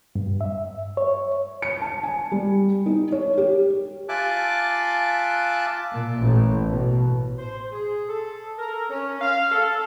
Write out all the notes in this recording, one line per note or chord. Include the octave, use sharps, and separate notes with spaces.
G2
E5
C#5
C#7
A5
G#5
G3
D#4
C#5
G4
F4 E5 G#5 A5 D6 F#6
A#2
A1
B2
C5
G#4
A4
A#4
C#4
F5
A4